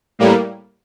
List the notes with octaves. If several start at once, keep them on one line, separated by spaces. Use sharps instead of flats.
A2 G3 A#3